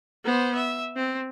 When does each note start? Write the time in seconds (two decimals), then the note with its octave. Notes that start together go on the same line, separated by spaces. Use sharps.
0.24 B3 C5
0.55 E5
0.96 C4